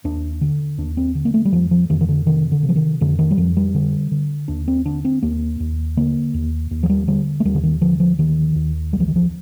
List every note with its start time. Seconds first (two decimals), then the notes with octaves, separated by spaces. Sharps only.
0.04 D#2 D4
0.41 D3
0.78 D#2 D4
0.97 C4
1.15 D3
1.25 A#3
1.34 A3
1.45 G3
1.52 F2 F3
1.71 F3
1.90 F2 D#3
2.01 D#3
2.09 D3
2.26 C3 D#3
2.52 D3
2.63 C3
2.69 F3
2.76 D#3
3.01 F2 D3
3.19 D#3
3.31 G3
3.37 F2 F3
3.57 G3
3.75 D3
4.11 D3
4.48 D#2 D4
4.68 C4
4.85 D3 D4
5.05 C4
5.22 D#2 A#3
5.60 D#2
5.97 D3 A#3
6.34 D#2
6.71 D#2
6.83 F3
6.90 G3
7.08 D3 G3
7.40 A3
7.45 D#2 G3
7.55 D3
7.63 D#3
7.81 D3 F3
8.00 F3
8.18 D#2 D#3
8.55 D#2
8.93 C2 G3
9.00 F3
9.08 D#3
9.16 F3